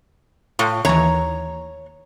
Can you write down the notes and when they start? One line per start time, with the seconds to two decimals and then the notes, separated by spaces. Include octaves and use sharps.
0.59 A2 F4
0.85 D#2 E3 C#5 A#5